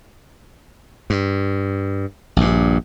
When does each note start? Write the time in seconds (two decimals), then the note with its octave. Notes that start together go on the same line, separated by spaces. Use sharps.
1.10 G2
2.36 A#1 G2